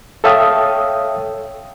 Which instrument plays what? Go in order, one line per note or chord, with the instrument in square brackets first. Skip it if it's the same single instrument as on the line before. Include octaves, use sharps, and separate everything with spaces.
[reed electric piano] A4 C#5 E5 F5 G5 D#6